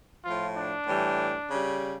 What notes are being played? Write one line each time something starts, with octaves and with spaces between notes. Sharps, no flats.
A2 F3 F4
D4
A2 E3 G3
C#3 G3